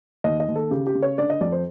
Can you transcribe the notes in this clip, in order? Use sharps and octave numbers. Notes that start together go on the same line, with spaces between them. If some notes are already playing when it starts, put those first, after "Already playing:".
D#2 D#5
D#5
D#2
A4
C#3 G4
G4
C#3
C#5
D3 D5
D#5
F2 D5
C5